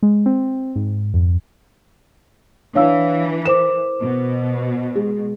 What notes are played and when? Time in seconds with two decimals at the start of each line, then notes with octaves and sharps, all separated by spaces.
0.03 G#3
0.26 C4
0.76 G#2
1.14 F2
2.75 E3 D4 C#5 F5 E6
3.45 A#4 C5 D6 E7
4.03 B2
4.95 G#3